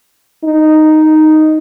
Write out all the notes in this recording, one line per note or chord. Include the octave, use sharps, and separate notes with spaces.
D#4